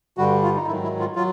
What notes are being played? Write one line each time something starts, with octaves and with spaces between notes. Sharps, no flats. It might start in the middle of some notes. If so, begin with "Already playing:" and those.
G2 D3 G3 F#4
F4
D#4
G#2 D#3 F#3 E4
E4
F4
F#3 F4